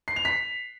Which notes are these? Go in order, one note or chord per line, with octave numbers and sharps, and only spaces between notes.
C7
F7
B6